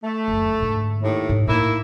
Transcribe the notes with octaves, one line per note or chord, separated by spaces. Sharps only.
A3
F#1 D2
G#2 D3
D#2 A2
G#2
A2 A#3 D#4 E4